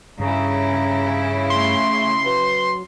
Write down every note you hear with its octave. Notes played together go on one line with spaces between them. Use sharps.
G2 C#3 E4 A#5
A3 C6
F#3 B4